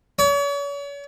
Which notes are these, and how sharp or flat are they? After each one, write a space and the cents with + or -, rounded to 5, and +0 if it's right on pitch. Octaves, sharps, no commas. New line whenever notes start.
C#5 +40